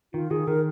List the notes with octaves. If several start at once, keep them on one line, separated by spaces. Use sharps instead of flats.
D#3 F4
D#3 G#4
D#3 A#4